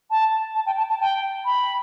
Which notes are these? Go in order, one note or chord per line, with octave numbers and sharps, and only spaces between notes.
A5
A5
G5
A5
A5
G5
B5